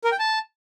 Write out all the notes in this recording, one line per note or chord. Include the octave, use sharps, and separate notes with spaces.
A#4
G5
A5